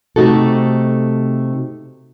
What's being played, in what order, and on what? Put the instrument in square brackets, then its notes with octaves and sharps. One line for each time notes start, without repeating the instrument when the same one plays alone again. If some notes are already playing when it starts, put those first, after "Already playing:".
[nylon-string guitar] C3 A3 D#4 F#4 A4